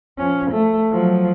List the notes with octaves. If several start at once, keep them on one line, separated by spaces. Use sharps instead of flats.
F3 C#4
A3
F3 F#3